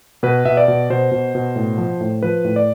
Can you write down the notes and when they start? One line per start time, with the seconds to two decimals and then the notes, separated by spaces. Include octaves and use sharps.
0.23 B2 B4
0.45 B2 E5
0.57 D5
0.68 B2
0.90 B2 C5
1.12 B2
1.35 B2
1.56 A2
1.78 F3
2.01 A2
2.23 F3 B4
2.44 A2
2.56 D5